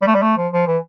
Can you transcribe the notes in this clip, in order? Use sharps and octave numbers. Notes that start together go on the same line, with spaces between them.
G3
A3
G3
A3
F3
F3
E3